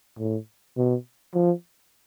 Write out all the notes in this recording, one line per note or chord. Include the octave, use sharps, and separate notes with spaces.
A2
B2
F3